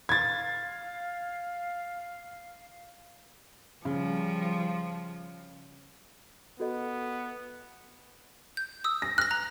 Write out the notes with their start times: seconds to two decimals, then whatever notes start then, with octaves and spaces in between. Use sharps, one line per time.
0.09 F5 G#6 A6
3.85 C#3 F3 G3
6.60 B3 F#4 A4 D#5
8.57 G6
8.84 D#6 E6
9.02 A#6
9.18 F6 F#6 A#6
9.31 A#5